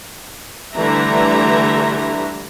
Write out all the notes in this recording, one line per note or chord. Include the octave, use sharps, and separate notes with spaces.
D3 E3 G3 A3 E5 A#5